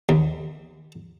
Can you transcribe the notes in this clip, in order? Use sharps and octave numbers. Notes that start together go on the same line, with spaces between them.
D#2